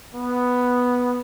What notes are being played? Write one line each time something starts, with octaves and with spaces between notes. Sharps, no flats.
B3